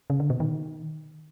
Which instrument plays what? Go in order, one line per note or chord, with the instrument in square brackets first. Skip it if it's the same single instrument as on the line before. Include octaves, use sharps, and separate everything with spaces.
[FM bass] C#3
D3
B2
D#3